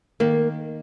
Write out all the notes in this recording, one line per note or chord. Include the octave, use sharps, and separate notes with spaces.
D#3 A#3